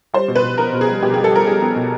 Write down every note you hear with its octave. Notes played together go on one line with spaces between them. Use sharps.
G3 C5
B2
B4
B2
B3 A#4
B2
G#4
G3
B2 G4
G3 G#4
A4
G3 A#4
G3 G#4
B3
B2